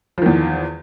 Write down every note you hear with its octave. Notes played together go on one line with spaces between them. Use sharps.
E2 D#3 F3